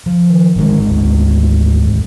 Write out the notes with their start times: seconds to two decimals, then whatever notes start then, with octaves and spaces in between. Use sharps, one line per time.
0.06 F3
0.29 D#3
0.56 G#1 D3 D#3 G#3
0.88 D2
1.84 F2